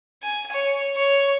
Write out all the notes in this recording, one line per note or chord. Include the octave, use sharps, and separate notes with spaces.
G#5
C#5
C#5